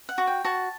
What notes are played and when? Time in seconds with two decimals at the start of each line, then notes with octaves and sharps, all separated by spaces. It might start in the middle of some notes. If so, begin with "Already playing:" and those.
0.09 F#5
0.18 F#4
0.27 G5
0.44 F#4 A5